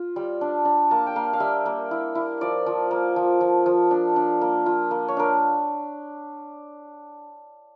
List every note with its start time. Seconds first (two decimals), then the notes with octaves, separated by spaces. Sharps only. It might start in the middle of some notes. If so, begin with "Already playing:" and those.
Already playing: F4
0.16 G3
0.41 D4
0.65 D4
0.91 A#3 A5
1.07 G5
1.16 A#3 F5
1.33 F5
1.40 G3 E5
1.66 A#3
1.91 E4
2.15 E4
2.41 F3 D5
2.66 F3
2.91 A#3
3.16 F3
3.41 F3
3.66 F3
3.91 D4
4.16 D4
4.41 A#3
4.66 F4
4.91 A#3
5.08 C#5
5.17 D4 A#4